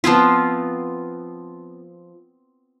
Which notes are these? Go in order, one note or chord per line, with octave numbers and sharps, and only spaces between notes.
F3 B3 C4 F4